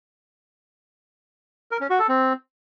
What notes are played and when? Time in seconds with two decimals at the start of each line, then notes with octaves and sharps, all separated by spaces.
1.71 A#4
1.81 C#4
1.90 F#4
1.99 A4
2.09 C4